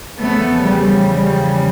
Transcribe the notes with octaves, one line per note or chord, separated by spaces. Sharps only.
E2 C#3 F3 A3 B3
G3
G3